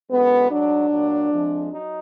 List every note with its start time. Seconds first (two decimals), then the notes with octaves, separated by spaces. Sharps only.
0.10 F#2 D3 G#3 B3
0.50 G#2 F#3 D4
0.90 A#2 F#3
1.31 F2 F3 G#3
1.70 F#3 D#4